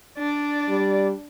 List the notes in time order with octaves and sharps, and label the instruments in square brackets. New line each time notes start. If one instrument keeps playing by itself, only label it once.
[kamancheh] D4 D5
[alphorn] G3